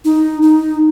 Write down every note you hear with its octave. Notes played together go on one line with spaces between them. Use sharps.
D#4
D#4